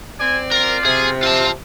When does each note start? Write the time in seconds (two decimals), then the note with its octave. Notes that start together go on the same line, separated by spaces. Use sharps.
0.20 C4 D5 G#5
0.51 F4 A#4
0.85 C3 G#4
1.23 C4 F4 A5